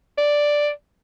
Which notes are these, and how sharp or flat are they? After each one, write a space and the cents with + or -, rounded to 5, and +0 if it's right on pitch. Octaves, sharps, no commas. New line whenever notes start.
D5 +0